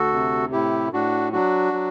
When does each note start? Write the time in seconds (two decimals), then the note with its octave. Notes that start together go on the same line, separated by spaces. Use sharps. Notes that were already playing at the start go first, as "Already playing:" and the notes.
Already playing: D2 F#4 A4
0.13 C3
0.52 A2 E4 G4
0.93 A2 D4 F#4
1.33 F#3 D4 F#4
1.73 F#3